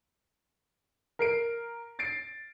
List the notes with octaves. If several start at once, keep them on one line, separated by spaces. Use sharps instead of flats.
A#4 C7 D7
A6 C7 D7